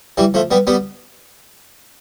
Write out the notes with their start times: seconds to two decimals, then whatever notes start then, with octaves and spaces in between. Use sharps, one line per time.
0.17 E3 G3
0.34 F3 A3
0.51 G3 B3
0.67 G3 B3